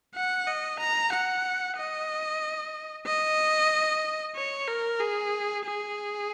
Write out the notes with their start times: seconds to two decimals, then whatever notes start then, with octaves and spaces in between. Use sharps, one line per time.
0.15 F#5
0.47 D#5
0.79 A#5
1.12 F#5
1.77 D#5
3.06 D#5
4.35 C#5
4.68 A#4
5.00 G#4
5.65 G#4